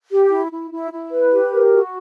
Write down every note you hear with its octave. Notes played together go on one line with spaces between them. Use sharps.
G4
E4
E4
E4
E4
B4
G4
A#4
F#4